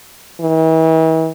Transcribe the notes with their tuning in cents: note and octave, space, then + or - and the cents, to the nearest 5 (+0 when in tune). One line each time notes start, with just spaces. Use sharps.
E3 -40